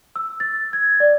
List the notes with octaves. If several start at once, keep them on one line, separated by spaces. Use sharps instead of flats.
E6
A6
G#6
D5